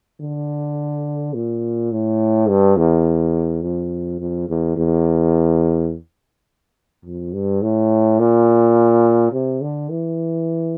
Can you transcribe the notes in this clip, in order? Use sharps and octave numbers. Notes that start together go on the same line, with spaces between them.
D3
A#2
A2
G2
E2
F2
F2
E2
E2
F2
G2
A2
A#2
C3
D3
E3